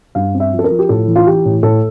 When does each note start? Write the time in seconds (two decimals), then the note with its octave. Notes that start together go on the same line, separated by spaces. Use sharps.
0.15 G2 F5
0.34 C4
0.40 E5
0.53 F3
0.59 A4
0.64 A#4
0.70 F3
0.79 G4
0.89 A2 A4
1.08 E3
1.16 F4
1.27 E3 G4
1.45 A2
1.63 A2 A4